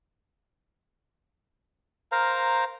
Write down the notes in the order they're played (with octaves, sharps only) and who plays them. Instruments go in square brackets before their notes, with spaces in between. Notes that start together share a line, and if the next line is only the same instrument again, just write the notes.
[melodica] A#4 C5 F5 A#5